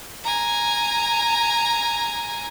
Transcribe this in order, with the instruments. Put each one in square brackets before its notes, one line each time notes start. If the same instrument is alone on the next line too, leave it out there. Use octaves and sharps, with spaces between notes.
[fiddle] G#5 A#5